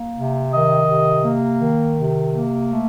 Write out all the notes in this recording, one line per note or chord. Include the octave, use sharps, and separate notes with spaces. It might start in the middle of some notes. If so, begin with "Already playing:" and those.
Already playing: A#3
C3
D#3 D#5
C3
A#3
D#3
C3
A#3
A3